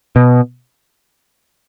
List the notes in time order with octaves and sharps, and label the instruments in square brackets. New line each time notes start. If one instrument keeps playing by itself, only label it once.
[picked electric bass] B2